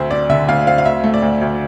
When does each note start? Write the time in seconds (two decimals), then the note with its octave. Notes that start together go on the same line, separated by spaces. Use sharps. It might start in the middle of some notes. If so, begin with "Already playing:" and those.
Already playing: D2 A3 C4 C5 E5
0.11 C4 D5
0.29 D3 E5
0.48 D2 F5
0.67 C4 F5
0.78 F5
0.85 D2 E5
1.04 A3
1.14 D5
1.22 D2
1.41 D2